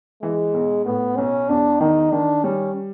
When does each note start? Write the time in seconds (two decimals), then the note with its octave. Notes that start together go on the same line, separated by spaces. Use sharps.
0.22 E3 G#3
0.54 B1
0.85 A2 B3
1.17 B1 C#4
1.49 E2 D4
1.80 D#3 D#4
2.12 D#3 D4
2.44 G3 C#4